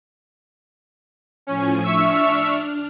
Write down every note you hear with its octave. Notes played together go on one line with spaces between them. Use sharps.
A2 F3 C#4 G#5
D4 E5 C#6 E6 F6